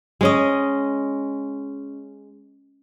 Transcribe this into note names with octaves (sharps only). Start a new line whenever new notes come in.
G#3 C#4 D#5